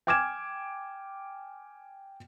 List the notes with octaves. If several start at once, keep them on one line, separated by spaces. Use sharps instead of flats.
G5 G#5 D6 F6 G#6 E7